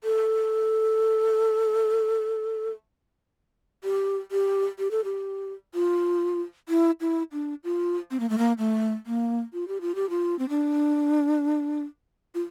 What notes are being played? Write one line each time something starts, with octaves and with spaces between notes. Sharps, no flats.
A4
G4
G4
G4
A4
G4
F4
E4
E4
D4
F4
C4
A#3
A3
A#3
A3
A#3
F4
G4
F4
G4
F4
C4
D4
F4